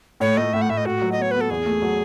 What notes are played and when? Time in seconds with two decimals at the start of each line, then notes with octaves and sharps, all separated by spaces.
0.20 A2 C#5
0.37 A3 D#5
0.53 A2 E5
0.62 F#5
0.69 A2 E5
0.77 D#5
0.86 A2 F#4
1.01 F#3
1.12 D#5
1.18 B3 C#5
1.31 B3 B4
1.41 A4
1.50 E2 G#4
1.66 A3
1.82 F#3